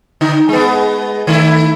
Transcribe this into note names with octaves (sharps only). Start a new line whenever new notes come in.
D3 D#4
G#3 B3
D#3 A3 E4